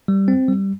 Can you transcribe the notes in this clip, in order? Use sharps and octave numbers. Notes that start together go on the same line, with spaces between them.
G3
C4
G3